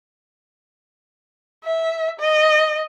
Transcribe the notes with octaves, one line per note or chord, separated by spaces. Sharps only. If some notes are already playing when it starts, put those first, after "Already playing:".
E5
D#5